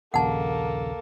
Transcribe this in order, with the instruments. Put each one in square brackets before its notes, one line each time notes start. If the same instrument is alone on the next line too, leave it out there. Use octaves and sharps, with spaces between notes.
[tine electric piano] A#1 D#2 C#3 [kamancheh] A#3 A4 [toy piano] F#5 A5